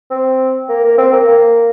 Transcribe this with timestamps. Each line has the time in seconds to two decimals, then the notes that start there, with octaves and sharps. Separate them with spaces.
0.11 C4
0.69 A#3
0.84 A#3
0.98 C4
1.13 A#3
1.28 A#3